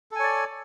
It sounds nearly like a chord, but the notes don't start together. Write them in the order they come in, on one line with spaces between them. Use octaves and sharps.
A4 G#5 C#5 D5